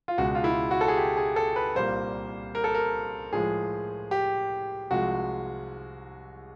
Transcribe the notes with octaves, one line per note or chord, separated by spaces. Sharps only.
F4
C#2 B2 G#3 F#4
F4
E4
F#4
A4
G#4
G4
G#4
A4
B4
C2 A#2 G3 A#3 C5
A#4
A4
A#4
A2 F3 G#3 G#4
G4
C2 C3 F3 G#3 F#4